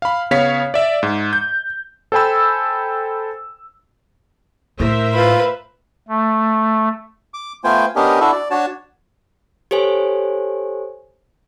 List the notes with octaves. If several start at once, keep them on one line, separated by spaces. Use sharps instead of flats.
F5 B5
C#3 B3 C#5 F5 B6
D5 E5
G#2
G6
A4 C5 G5 G#5 B5 E6
A2 A#4 C5 E5
F4 B4
A3
D6
A3 B3 F4 C5 G5 G#5
B3 C#4 D4 G4 A#4 D#5
D4 E4 F#4 A4 E5
D5
D4 F#4 C#5 A5
G4 A4 C5 C#5 G#5